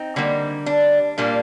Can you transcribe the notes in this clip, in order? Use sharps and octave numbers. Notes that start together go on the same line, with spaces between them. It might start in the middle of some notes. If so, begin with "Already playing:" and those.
Already playing: C4 D#4
D3 G3 A#3
D4
A#2 G3 A#3 D4